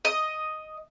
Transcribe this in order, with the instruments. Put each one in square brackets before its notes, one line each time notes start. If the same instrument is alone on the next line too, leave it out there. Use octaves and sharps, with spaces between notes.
[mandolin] D#5